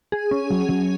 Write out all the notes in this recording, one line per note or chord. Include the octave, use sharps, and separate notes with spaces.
G#4
C#4
F#3
F#3